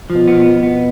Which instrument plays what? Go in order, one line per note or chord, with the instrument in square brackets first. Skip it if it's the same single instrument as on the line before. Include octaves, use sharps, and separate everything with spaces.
[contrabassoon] B2 [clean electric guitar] F3
[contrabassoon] B2 [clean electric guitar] B3
[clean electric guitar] B3
B3